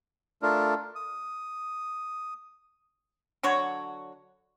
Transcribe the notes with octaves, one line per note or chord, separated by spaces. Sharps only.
A3 D4 F4 A#4
D#6
D3 F#3 F#4 C#5